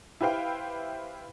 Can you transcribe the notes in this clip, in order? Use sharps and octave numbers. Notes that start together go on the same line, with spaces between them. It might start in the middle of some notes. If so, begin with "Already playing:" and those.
E4 G4 B4 C5 F5 G5